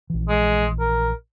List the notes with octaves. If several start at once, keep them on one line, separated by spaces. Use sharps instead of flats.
A#1 E3
G#3
A#4